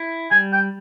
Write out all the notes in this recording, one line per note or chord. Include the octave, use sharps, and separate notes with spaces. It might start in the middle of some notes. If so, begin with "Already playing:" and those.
Already playing: E4
G3 G#5
G5